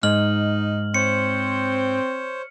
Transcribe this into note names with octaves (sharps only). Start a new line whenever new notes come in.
G#2 D#4 F6 F#7
C4 C5 C#5 C#7